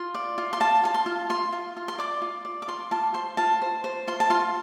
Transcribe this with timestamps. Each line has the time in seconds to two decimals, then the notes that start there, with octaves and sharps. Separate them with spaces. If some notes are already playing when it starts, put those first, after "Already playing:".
Already playing: F4 C6
0.14 D5
0.38 F4
0.53 C6
0.60 F4 A5
0.84 F4 A5
0.94 C6
1.06 F4
1.30 F4 C6
1.52 F4
1.77 F4
1.88 C6
1.98 D5 D6
2.22 F4
2.45 D5
2.62 D6
2.68 F4 C6
2.91 F4 A5
3.14 C5 C6
3.37 F4 A5
3.62 C5
3.84 C5
4.07 F4 C6
4.20 A5
4.30 F4 C6